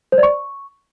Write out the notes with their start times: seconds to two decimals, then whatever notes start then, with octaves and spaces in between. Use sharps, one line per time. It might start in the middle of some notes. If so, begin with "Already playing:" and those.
0.12 C5
0.18 D5
0.23 C#6